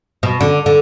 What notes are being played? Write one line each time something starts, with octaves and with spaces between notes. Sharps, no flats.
B2
D3
D3